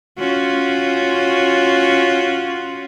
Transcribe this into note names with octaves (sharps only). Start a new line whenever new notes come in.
C#4 F4 F#4